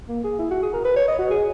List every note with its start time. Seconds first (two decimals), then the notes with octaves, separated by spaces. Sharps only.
0.09 A#3
0.24 G#4
0.39 E4
0.51 F#4
0.62 G#4
0.73 A#4
0.85 B4
0.96 C#5
1.08 D#5
1.19 F#4
1.30 G#4